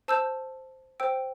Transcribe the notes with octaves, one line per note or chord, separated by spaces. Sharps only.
C5 A5 E6 G6
C5 G5 E6